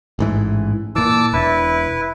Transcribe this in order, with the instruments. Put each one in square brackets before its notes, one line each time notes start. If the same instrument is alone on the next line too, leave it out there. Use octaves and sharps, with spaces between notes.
[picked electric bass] A1 G#2 E3
[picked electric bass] A#2 E3 [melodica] A5 D6 E6
[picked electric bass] E1 [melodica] E4 B4